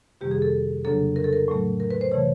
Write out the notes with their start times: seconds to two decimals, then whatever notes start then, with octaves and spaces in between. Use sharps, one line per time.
0.21 F2 C3 D#3 G3 A#3 G4
0.31 G#4
0.42 A4
0.84 F2 C#3 F#3 A#3 D4 A4
1.16 A#4
1.24 A4
1.33 A#4
1.48 A2 F#3 A3
1.80 A#4
1.91 B4
2.01 C5
2.11 C3 E3 A3 C#5